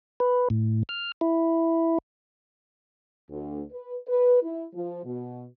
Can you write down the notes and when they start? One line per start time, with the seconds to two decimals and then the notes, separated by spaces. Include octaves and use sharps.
0.20 B4
0.50 A2
0.89 F6
1.21 E4
3.30 D2
3.72 B4
4.08 B4
4.43 E4
4.74 F3
5.05 B2